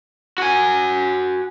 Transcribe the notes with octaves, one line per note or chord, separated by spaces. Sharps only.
F#4 G#5